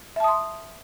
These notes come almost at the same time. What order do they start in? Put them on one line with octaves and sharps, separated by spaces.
E5 A5 D#6 C6